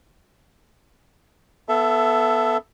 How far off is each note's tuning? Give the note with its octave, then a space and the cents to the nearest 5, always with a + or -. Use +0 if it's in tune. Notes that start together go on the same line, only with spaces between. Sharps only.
B3 -10 A4 +0 E5 +20